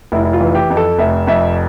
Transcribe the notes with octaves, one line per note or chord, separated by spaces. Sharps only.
F1 E4
E4
F4
E3
G4
F2
A4
F1 E5
F2 E5